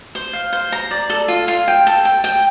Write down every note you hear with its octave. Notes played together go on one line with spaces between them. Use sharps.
C5
F5
C5
A#5
D5
A4
F4
F4
G5
A4
G5
G5